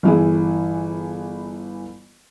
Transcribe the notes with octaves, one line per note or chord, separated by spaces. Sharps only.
G1 E3 G#4